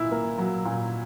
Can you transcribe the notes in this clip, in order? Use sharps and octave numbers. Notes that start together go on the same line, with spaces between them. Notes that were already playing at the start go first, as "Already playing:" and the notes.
Already playing: A#2 E4
A#3
F#3
A#2